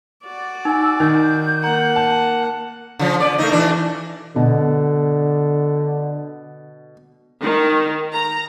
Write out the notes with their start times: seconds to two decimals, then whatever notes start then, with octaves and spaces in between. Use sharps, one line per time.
0.24 F#4 D5
0.65 D#4 G#5 E6
1.00 D#3 D#4 G6
1.64 A#3 F#5 A#5
1.96 A5
2.99 C#3 F3
3.20 B3 D5
3.38 A3 A#3 D#4
3.52 B2 E3 D4
4.36 B2 D3
7.43 D#3
8.13 A#5